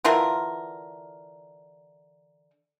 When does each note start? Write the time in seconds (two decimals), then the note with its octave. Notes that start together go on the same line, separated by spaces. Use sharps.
0.04 D3 E3 F4 A#4